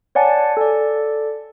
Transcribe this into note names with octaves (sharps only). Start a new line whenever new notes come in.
C#5 D5 F#5 G#5 A5
A4 D5